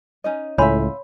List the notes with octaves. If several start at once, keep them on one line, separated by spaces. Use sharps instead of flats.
C#4 D#4 D#5
C#2 A2 C#5 E5 F5 G#5 B5 C6